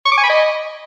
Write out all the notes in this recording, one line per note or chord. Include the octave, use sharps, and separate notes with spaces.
C#6
D6
G#5
B5
D#5